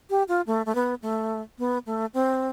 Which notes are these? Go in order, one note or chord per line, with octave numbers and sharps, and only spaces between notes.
G4
F4
A3
A3
B3
A3
B3
A3
C4